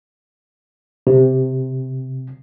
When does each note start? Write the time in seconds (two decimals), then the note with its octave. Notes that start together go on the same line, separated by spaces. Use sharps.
1.07 C3